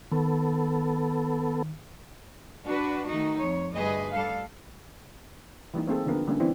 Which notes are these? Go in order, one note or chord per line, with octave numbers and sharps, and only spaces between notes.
D#3 B3 A4
D4 F#4 B4
D#3 A3 D#4 F#4
F2 C#5
D2 G2 G#4 B4 D#5
G3 A4 F5
E3 G3 A#3 D#4
A3 A#3 C4 G#4 A4
D3 F3 A#3 B3 A#4
D3 G3 A3 A#3 C#4
E3 B3 C4 D4 E4